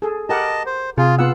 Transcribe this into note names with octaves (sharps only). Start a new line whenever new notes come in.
G#4 A4
G4 A#4 D#5 F#5 A5
C5
C3 F4 G#4
B3 F4 F#5 E6